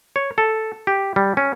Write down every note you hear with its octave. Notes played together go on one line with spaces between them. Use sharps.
C#5
A4
G4
G3
C#4